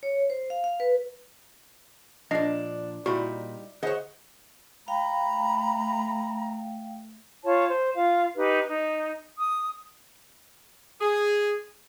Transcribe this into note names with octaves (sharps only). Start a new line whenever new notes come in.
C#5
C5
F5
F5
B4
A#2 F3 D4 D#5 C7
A#2 G3 D#4 E4 F#4
D2 G#4 C5 C#5 D#5 F#5
A3 F5 G5 A#5 B5
F4 C#5 A5
C5
F4 F5
D#4 G4 B4
D#4
D#6
G#4